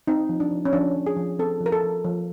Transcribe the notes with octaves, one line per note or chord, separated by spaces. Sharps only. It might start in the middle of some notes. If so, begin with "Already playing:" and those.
C4 D#4
F3
D4
F3
C#4
F3 D4
F3
G#4
F3
C4 A4
F3
A#4
A4
F3
F3